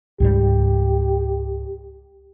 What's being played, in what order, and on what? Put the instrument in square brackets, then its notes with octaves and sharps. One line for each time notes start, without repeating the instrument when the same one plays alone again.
[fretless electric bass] C#2 G#2 G3 [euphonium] G4